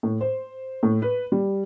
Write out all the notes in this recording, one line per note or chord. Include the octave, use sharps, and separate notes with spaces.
A2
C5
A2
B4
G3